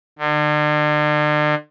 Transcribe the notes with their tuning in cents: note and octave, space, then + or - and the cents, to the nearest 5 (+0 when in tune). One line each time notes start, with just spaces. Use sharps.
D3 +40